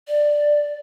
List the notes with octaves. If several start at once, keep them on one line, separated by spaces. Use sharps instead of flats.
D5